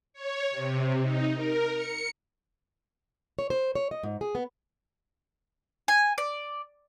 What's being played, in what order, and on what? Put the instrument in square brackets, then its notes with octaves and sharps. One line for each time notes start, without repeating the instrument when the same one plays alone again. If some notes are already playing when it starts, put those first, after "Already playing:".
[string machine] C#5
C3
D#4
A#4
C#7
[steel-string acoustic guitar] C#5
C5
C#5
D#5
G#2
G#4
B3
[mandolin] G#5
D5